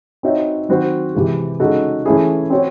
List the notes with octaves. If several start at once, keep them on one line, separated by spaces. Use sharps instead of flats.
C4 D#4 F#4 C#5 E5
D#3 F#3 C4 F#4 C5
C3 E3 G#3
C#3 G#3 D#4 F#4 A4
E3 A3 C#4 E4 G#4
C4 F#4 C#5